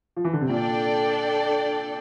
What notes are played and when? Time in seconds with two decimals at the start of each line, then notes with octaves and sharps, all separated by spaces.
0.17 F3
0.24 E3
0.33 D3
0.41 C3
0.50 A#2 D4 A4 D5 G5